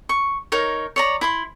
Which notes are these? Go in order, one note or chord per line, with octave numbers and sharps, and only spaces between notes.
C#6
D#4 A#4 C#5
C#5 D5 A#5
E4 B5 C6